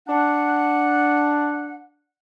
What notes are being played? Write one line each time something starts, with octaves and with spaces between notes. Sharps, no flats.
D4 F#5